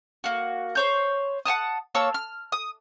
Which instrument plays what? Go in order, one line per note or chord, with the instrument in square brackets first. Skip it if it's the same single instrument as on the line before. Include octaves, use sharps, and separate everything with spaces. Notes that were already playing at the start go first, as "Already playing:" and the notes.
[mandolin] A#3 F#4
C5 C#5 G6
F#5 G#5 A5 D#6
A#3 C#5 A5 E6
F6
D#6